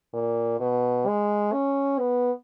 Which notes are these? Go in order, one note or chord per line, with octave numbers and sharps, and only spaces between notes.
A#2
B2
G#3
C#4
B3